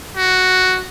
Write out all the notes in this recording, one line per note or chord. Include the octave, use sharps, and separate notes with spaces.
F#4